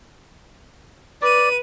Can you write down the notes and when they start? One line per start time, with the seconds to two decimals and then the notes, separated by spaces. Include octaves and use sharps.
1.22 B4 D5 D#7